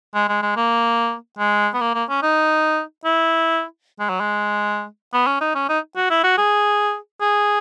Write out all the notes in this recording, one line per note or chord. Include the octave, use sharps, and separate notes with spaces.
G#3
G#3
G#3
A#3
G#3
B3
A#3
A#3
C#4
D#4
E4
G#3
F#3
G#3
B3
C#4
D#4
C#4
D#4
F#4
E4
F#4
G#4
G#4